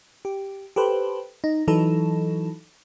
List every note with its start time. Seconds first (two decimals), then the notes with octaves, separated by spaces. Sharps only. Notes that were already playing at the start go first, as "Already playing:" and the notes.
0.25 G4
0.76 G4 A4 B4 C5
1.44 D#4
1.68 E3 F#3 D#4 A4